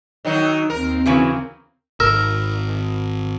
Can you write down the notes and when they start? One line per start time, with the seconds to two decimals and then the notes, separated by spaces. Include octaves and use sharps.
0.25 D#3 F#3 D#4
0.70 D#2 C4 A#4
1.06 C#3 E3 F#3 C4
2.00 G#1 A#4 E6